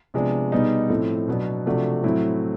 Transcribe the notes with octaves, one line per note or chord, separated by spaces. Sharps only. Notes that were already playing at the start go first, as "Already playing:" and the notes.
C3 F3 G#3 B3 D4
B2 G3 B3 D#4 G#4
A2 F3 A3 C4
B2 F#3 B3 D4
C3 F3 A3 D4 F#4
A2 F#3 A3 C4 E4